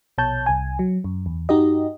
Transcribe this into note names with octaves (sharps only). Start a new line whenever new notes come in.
A#1 B2 C#5 A5 G6
C2 G#5
F#3
F#2
E2
G2 D#4 F#4 G4 D#5